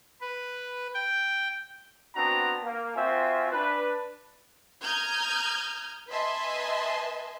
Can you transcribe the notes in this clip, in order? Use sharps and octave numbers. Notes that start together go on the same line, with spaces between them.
B4
G5
B3 C4 D4 F#4 A#5
A#3
C4 F4 F#4 E5 G#5
D4 B4
A#5 D#6 F6 G6 G#6
B4 D#5 E5 G#5 A5 C6